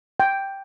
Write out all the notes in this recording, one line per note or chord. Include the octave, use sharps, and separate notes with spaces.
G5